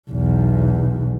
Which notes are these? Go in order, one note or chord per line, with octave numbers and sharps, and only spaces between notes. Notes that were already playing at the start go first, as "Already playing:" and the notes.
B1 E2